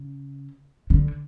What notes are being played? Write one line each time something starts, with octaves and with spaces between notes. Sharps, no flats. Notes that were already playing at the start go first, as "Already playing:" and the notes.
Already playing: C#3
D3